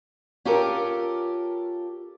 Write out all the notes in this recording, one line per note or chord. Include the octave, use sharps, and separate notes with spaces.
C#4 F4 G4 A4 A#4